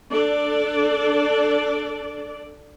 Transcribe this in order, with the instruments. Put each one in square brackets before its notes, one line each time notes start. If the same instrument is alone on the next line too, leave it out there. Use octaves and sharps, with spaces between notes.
[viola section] D4 A4 D5